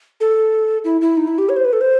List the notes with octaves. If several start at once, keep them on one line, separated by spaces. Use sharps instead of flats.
A4
E4
E4
D#4
E4
G4
C#5
C5
B4
A4
C5